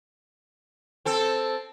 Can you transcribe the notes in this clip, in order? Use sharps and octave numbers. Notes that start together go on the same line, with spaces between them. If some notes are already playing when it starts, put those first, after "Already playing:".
C4 A4